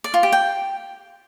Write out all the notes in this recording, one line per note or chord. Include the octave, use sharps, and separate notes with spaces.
D5
F4
G4
G5